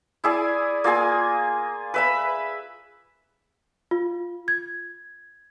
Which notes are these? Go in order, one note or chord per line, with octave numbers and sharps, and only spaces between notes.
E4 G#4 D5
A#3 F4 G#4 G#5
B4 E5 B5
F4
G#6